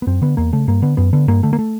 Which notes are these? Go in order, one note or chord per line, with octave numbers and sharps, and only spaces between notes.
B3
F#2 C4
D3 B3
E2 A#3
C#3 A3
G2 A#3
D3 B3
F#2 B3
D3 B3
G2 A#3
D3 A3
A#3
A3